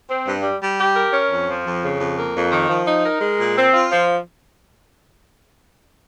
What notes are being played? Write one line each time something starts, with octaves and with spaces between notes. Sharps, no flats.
C4
G2
G3
G3
G4
A#4
C#4
F2
F3
F2
C#3
F2
A#3
F2
D#3
F3
D#4
A#4
G#3
A#2
C4
F4
F3